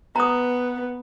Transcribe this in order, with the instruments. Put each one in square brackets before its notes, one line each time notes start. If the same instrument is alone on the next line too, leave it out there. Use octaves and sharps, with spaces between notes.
[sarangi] B3 [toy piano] A#5 D#6